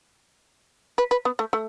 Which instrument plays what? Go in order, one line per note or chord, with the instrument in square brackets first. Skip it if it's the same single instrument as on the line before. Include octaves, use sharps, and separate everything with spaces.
[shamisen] B4
B4
B3
A3
A3